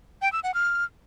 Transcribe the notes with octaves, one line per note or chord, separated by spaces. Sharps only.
G5
E6
F#5
F6